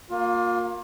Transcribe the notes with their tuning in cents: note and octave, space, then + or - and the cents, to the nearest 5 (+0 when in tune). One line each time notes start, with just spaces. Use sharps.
A#3 +0 F4 +30